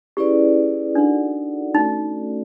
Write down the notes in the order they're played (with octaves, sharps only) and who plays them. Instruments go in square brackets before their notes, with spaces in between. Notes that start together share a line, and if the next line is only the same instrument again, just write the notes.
[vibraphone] C#4 E4 G#4 B4 D5 [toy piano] G4
[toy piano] D4 [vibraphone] D#4 F#4 A4 D5 F#5
[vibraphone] A3 C#4 F#4 A4 D5 [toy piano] D#4